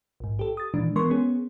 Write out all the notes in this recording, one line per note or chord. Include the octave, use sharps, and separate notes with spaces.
A#1 G#2
G4 A4
D#6 A6
A#2 D#3 E3 G#3 D4
E3 G#3 B3 A#4 C6 C#6
B3 C#4 G#4